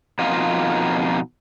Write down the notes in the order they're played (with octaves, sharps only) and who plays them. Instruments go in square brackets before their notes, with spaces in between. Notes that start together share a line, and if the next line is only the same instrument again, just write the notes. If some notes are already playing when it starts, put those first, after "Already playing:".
[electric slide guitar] F2 B2 A#3 D#4 F4